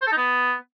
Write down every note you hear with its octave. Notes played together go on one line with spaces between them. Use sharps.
C5
A4
D#4
B3